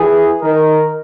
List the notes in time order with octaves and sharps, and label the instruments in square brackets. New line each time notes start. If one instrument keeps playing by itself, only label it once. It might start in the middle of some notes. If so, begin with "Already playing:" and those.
Already playing: [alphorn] E3 [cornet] G#4
[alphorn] D#3 [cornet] A#4